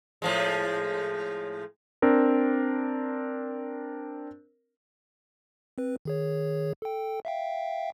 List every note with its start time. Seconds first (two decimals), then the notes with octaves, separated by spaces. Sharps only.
0.22 A2 F3 G#3
2.02 C4 D4 A#4
5.78 C4 B4
6.05 D#3 G#4 C#5
6.82 A4 G5
7.25 E5 F5 G5